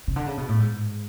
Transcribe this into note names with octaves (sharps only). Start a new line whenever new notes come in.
C#3
D3
C#3
B2
A2
G#2